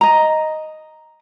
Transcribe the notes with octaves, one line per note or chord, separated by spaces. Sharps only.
D#5 A#5